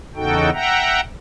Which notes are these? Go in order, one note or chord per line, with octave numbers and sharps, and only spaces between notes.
E2 C#3 D#4 F#4 A4 G5
E5 F#5 G5 A#5